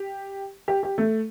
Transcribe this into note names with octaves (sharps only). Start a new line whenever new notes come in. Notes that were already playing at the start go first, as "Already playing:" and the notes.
Already playing: G4
G4
G4
A3